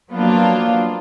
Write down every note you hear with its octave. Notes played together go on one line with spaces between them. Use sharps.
F3 F#3 A#3 B3 D4 F4